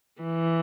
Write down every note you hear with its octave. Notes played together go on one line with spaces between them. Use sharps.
E3